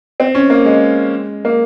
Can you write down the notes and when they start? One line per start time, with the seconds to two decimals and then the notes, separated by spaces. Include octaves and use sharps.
0.20 C4
0.35 C#4
0.50 A#3
0.65 G#3
1.45 A#3